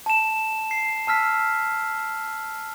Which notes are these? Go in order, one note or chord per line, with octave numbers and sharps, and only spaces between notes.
A5 E7
C7
A5 E6 F6 B6